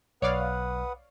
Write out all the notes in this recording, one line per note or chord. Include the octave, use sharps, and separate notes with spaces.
B1 B4 C#5 D5 F5 F#5 D#6